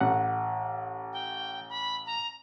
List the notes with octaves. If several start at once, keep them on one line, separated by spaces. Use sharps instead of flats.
A1 F#5
G5
B5
A#5